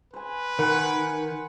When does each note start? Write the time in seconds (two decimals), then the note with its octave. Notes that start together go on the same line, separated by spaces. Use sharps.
0.14 B4 C5 G#5
0.59 D#3 A#4 F#5 G#5 B5 C6